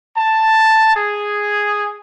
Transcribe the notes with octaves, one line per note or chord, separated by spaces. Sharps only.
A5
G#4